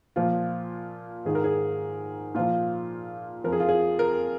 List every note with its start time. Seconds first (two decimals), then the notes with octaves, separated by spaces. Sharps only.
0.16 A#2 F3 F4
1.25 G#2 D#3 G#4
1.35 A#4
1.44 G#4
2.35 A#2 F3 F4
3.44 F2 F3 A#4
3.52 G#4
3.60 F4
3.69 G#4
3.99 A#4